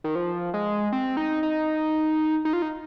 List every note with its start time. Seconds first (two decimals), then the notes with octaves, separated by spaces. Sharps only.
0.04 D#3
0.15 F3
0.54 G#3
0.92 C4
1.17 D#4
1.43 D#4
2.45 D#4
2.53 F4
2.62 D#4